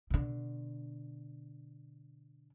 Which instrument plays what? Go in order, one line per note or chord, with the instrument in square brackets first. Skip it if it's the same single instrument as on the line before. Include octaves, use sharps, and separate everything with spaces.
[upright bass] B2 D3